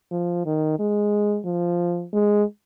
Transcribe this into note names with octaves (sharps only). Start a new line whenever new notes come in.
F3
D#3
G#3
F3
G#3